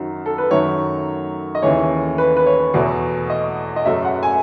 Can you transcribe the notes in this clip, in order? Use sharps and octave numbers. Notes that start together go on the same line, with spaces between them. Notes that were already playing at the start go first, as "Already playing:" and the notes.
Already playing: F#2 D#3 F#3
A4
B4
F#2 D#3 F#3 A3 C#5
D#5
D#2 C#3 E3 A3 C#5
B4
B4
C#5
E2 B2 A3
D#5
D#5
F#2 C#3 F#3 A3 E5
F#5
G#5